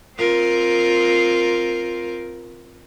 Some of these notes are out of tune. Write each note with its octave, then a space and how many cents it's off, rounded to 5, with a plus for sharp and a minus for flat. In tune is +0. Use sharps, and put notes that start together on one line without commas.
C4 +0 F4 +0 A#4 +5